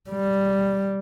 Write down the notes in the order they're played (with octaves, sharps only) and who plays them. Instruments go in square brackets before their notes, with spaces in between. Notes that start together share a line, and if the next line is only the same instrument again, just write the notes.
[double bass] G3